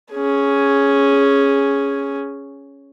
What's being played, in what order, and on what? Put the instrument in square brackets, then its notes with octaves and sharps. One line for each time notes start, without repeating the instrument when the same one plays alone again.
[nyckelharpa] C#4 G#4